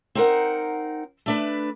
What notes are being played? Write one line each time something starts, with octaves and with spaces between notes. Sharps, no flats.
C4 D#4 A#4 F#5
A3 D4 B4